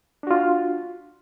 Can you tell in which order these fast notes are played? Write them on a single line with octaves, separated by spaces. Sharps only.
D4 F#4 F4